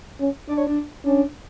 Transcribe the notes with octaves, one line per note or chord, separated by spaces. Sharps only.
C#4
D4 D5
C#5
D4
C#4 D4